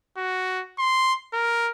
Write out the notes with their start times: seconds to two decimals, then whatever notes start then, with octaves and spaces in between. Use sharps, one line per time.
0.18 F#4
0.78 C6
1.33 A#4